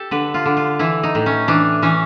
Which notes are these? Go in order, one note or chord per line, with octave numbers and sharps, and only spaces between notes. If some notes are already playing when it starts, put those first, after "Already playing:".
Already playing: G4 A4
D3 B4
F4
D3
F4
E3 E4
D#4
A2
C#4
E3 D4
E3 C#4